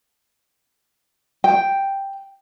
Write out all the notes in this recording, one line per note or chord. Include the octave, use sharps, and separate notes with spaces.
G5